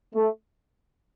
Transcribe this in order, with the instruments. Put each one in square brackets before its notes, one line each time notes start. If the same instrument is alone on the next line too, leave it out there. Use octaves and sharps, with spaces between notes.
[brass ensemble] A3